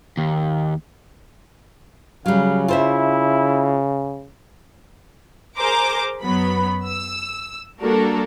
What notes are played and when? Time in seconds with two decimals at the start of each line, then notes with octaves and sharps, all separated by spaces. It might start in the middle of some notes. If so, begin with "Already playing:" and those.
0.17 D#2
2.26 C#3 F#3 G3 F5
2.68 E4 F4 C5 E5
5.57 G#4 A#4 C5 A#5 D6
6.22 F#2 F#3 B3 B5
6.85 E6
7.80 G3 A#3 D4 F#4 A4 A#4